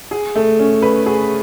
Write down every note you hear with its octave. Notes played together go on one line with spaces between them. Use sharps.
G#4
A3
C#4
B4
G#4